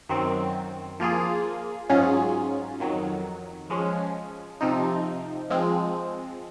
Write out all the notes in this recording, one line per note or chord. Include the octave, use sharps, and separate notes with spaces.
F#2 D#3 F#3 C4
F3 A#3 F4 G#4
G#2 F#3 C#4 F4 G#4
F2 D#3 F#3
F3 G#3 C#4
C3 F3 C4 D#4
F3 G#3 C4